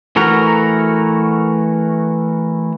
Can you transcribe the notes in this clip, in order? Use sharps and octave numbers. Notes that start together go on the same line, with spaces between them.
E3 A3 F#4 A#4